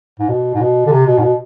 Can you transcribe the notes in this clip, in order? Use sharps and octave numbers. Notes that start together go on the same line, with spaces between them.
G#2
B2
G#2
B2
D3
C3
B2
G#2
B2